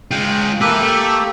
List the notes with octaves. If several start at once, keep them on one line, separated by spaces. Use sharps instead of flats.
G#3 F4 G5
A#3 E4 G4 A4 B4
A3